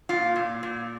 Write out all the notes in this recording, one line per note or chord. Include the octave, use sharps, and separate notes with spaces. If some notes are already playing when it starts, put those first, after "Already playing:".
A#2 F4
A#2
A#2